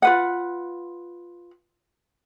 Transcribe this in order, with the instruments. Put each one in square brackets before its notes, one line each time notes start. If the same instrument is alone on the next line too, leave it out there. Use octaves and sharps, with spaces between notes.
[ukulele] F4 B4 F#5